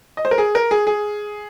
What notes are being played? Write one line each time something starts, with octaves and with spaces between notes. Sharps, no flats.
D#5
C5
A#4
G#4
A#4
G#4
G#4